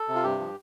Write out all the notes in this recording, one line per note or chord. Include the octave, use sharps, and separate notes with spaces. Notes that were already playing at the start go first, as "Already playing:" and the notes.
Already playing: A4
C3
F4
G2 G4
F3